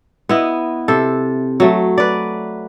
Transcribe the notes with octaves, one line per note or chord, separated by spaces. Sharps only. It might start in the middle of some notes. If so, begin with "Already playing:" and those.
B3 E4 D#5
C3 A4
F#3 A3
B4 D5